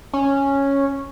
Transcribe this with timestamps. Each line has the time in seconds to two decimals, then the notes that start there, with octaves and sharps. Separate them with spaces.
0.13 C#4